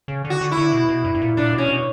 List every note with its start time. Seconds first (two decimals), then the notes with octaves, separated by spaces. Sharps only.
0.08 C#3
0.24 D3
0.30 F#4
0.41 D3
0.51 E4
0.57 D3
0.72 B2
0.89 B2
1.04 G2
1.15 G2
1.22 A#2
1.37 A#2 D4
1.53 B2
1.58 C#4
1.69 B2